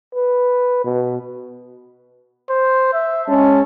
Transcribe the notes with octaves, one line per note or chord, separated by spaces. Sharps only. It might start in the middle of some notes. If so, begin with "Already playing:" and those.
B4
B2
C5
E5
G#3 C#4 A5